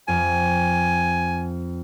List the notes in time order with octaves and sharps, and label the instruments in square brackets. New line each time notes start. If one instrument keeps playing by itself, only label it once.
[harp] F2 [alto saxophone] G#5